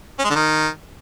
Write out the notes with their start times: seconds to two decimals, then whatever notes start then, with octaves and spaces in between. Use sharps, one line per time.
0.19 C#4
0.24 G#3
0.30 D3
0.35 D#3